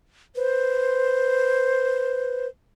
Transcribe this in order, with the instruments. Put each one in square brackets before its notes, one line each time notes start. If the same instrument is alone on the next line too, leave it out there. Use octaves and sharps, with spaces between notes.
[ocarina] B4 [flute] C5